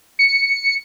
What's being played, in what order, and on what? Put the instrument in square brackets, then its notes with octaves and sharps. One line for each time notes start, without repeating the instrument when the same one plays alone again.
[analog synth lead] C#7